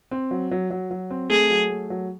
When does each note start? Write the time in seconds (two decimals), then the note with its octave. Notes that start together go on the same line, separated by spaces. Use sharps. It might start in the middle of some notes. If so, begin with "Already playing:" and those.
0.11 C4
0.31 F#3
0.51 F#3
0.71 F#3
0.91 F#3
1.11 C4
1.30 A3 G#4
1.50 F#3
1.70 A3
1.90 F#3